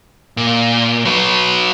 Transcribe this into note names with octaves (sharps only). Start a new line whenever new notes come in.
A#2
F#3 B4